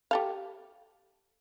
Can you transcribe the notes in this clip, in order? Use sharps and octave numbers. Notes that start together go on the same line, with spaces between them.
G4 A4 F5